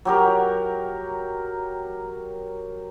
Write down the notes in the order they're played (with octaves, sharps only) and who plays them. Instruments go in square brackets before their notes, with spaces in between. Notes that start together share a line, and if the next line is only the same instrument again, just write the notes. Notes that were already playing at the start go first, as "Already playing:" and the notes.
[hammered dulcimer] F#3 G4 A#4